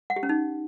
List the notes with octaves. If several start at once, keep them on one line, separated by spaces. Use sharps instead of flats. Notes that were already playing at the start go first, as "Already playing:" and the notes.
F#5
G4
C#4
D#4